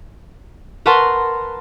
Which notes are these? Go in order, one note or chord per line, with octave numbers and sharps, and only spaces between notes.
A#4 B4 F#5 A5 C6 C#6